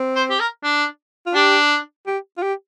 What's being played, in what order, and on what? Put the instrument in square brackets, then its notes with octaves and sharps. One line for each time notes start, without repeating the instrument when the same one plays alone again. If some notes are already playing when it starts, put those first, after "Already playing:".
Already playing: [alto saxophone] C4
[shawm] C5
G4
A#4
D4
[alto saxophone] F4
[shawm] D4 [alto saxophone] G4
[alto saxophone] G4
F4
G4